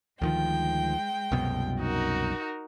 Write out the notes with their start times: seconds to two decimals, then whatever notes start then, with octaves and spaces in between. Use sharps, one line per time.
0.22 D2 D#3 F3 G#3 G5
1.32 C2 F#2 B2
1.79 D#4 F#4 A#4